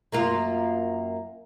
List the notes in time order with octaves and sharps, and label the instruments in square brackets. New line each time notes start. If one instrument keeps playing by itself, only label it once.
[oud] F#2 A#3 F4